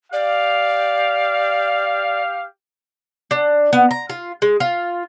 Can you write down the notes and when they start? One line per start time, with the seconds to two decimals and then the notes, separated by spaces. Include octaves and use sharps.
0.13 G4 D5 F5
3.31 D4
3.73 B3
3.91 A#5
4.09 F4
4.42 G#3
4.60 F4